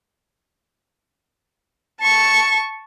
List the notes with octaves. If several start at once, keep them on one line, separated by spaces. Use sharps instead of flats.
A5 C#6